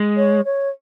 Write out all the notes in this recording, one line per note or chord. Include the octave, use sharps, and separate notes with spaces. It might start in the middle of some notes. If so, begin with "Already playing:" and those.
Already playing: G#3
C#5
C#5